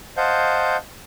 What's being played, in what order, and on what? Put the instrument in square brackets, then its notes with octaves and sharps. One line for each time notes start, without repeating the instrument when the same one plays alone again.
[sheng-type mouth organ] C5 D#5 F5 F#5 A5 G6